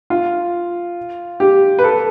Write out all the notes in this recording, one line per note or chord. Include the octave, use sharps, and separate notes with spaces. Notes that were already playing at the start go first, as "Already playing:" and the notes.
F4
G4
B4
A4